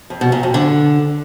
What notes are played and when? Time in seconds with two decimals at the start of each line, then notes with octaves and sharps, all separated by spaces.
0.10 F2
0.21 B2
0.32 A#2
0.43 F2
0.54 D3